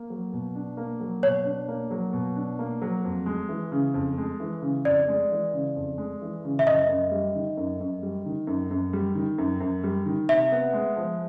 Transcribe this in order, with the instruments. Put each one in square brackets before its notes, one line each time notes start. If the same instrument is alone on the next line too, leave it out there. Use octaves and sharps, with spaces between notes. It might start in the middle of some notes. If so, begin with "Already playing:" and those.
Already playing: [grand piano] A#3
F#3
B2
D4
A#3
F#3
[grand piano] B2 [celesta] C#5
[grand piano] D4
A#3
F#3
B2
D4
A#3
F#3
F2
G#3
E3
C#3
F2
G#3
E3
C#3
[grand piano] F2 [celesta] D5
[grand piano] G#3
E3
C#3
F2
G#3
E3
C#3
[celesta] E5
[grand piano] F#2 [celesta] D#5
[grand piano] F#2
G3
D#3
F#2
F#2
G3
D#3
F#2
F#2
G3
D#3
F#2
F#2
G3
D#3
[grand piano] C3 [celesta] E5
[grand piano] B3
G#3
F3